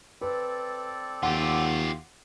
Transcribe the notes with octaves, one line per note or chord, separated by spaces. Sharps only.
C4 A4 B4 D5
D#2 F4 G4 F#5